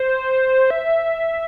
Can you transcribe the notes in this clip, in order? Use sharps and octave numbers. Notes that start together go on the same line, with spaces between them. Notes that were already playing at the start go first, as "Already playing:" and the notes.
Already playing: C5
E5